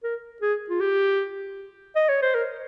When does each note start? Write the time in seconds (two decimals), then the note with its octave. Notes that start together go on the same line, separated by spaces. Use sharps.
0.03 A#4
0.42 G#4
0.70 F4
0.80 G4
1.95 D#5
2.09 C#5
2.22 C5
2.35 A#4